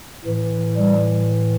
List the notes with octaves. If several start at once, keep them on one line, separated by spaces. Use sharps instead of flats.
A2 E3
G3